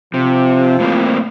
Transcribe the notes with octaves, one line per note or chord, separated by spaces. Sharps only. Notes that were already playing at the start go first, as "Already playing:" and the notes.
C3 F3
A2 A#3 C4